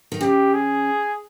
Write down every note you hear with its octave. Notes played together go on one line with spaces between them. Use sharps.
D#3
C#3 G4
G#4